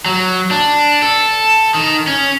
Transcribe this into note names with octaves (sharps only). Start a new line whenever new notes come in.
F#3
D4
A4
D#3
C#4